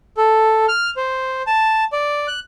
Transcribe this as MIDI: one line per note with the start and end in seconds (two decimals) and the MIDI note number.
0.17 0.66 69
0.69 0.91 89
0.97 1.42 72
1.47 1.84 81
1.93 2.27 74
2.27 2.40 90